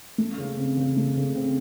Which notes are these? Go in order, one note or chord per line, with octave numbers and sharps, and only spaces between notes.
A3
C#3
C4
C#3
A3
C#3
C4